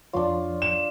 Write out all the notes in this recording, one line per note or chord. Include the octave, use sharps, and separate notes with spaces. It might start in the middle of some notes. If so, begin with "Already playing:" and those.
F2 F3 D4 F4 C#5
E7